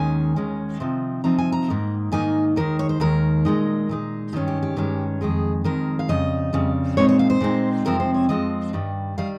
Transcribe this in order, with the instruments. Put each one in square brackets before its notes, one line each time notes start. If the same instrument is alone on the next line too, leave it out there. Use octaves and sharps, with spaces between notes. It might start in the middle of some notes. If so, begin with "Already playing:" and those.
Already playing: [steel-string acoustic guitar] D#2 D#3 G#3 C#4 G#5
D#2 D#3 G#3 C#4
C3 F3 C4 D#4
C3 F3 C4 D#4 A#5
G#5
A#5
G#2 D#3 A#3 D#4
G#2 D#3 A#3 D#4 G#5
D#2 D#3 G#3 A#4
C#5
C5
D#2 D#3 G#3 A#4
A#2 G#3 D#4
A#2 G#3 D#4
G2 D#3 G#3 C#4 G4
G4
G4
G2 D#3 G#3 C#4
F2 D#3 G#3 G#4
F2 D#3 G#3 A#4
F5
F2 C#3 G3 D#5
F2 C#3 G3
A#2 G#3 C4 D#4 C#5
C#5
F5
C5
A#2 G#3 C4 D#4
F2 C3 F3 G#3 C4 A#4
C5
C#5
F2 C3 F3 G#3 C4 D#5
G2 D#3 G3
D#3 G3 F5